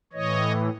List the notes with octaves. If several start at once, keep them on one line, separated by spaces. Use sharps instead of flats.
A2 E3 C#5 D#5